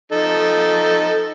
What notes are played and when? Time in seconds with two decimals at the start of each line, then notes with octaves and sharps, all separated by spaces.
0.12 F3 D#4 A4